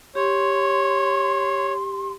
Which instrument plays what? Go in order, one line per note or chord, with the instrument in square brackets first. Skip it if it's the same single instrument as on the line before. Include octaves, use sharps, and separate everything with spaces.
[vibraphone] G4 [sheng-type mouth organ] C#5 [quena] C6